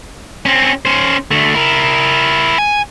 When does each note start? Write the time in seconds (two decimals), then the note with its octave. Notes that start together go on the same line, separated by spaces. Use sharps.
0.46 C4 C#4
0.85 C#4 C5
1.31 D2 A3
1.54 E4 A#4
2.58 G#5